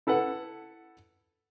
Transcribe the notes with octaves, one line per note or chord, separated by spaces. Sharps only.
E4 A4 B4 F#5